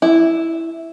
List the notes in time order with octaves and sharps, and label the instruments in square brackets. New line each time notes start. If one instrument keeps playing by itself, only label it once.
[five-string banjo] E4